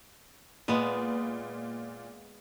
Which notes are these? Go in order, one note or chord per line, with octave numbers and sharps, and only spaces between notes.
A#2 G#3 B3